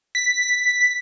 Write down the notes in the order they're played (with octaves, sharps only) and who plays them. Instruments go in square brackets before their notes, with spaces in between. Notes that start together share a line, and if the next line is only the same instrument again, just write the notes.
[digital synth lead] B6